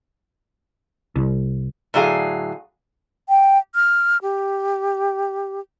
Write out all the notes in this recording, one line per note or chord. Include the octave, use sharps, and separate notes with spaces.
C2
A2 D3 F#3 G#4 F5
G5
F6
G4